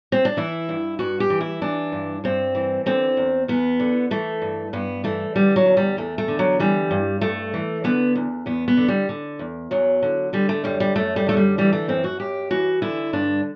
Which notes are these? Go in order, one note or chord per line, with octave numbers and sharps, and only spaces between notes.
C4
D4
E3 E4
G2
G2 F#4
G4
E3
E4
E3 D4
G2
G2 C4
E3
D3 C4
E2
E2 B3
D3
E3 A3
G2
G2 B3
E3 A3
D3 G3
F#3
E2
G3
E2 A3
A3
D3
F#3
E3 G3
G2
G2 A3
E3
D3 B3
E2
E2 B3
B3
D3
G3
D3
E2
E2 F#3
D3
D3 G3
A3
F#2 G3
G3
F#2 A3
G3
D3 A3
G3
E3 G3
A3
F#2 C4
F#4
F#2 G4
E3 F#4
D3 E4
G2 D4